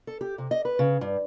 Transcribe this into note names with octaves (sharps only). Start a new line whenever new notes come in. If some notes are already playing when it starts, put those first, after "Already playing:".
A4
G4
C3
D#5
B4
C#3
G2